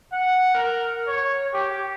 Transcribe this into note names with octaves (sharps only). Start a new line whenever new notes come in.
F#5
A#4
C#5
G4